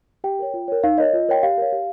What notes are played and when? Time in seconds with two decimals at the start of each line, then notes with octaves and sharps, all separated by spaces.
0.24 G4 G5
0.39 A#4 C#5
0.54 F4
0.68 A#4 C#5
0.83 D#4 F5
0.98 A#4 C#5 D#5
1.13 F4
1.28 A#4 C#5 G5
1.43 G4 F5
1.58 A#4 C#5
1.72 G4